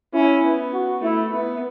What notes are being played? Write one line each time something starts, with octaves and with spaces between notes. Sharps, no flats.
C#4 E4
B3
F#4
A3 E4
B3 E4